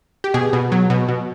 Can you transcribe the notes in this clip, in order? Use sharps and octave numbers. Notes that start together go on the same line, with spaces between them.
G4
B2 G#4
B2
F#3
B2
B2